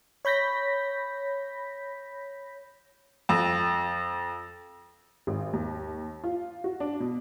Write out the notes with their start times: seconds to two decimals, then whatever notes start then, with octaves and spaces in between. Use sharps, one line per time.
0.25 C#5 B5 G6 A#6 B6
3.29 F2
5.27 G#1
5.53 D#2
6.24 F4
6.64 F#4
6.80 D4
7.00 B2